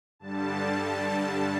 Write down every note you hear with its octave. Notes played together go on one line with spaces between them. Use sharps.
G2 D3 G3 A5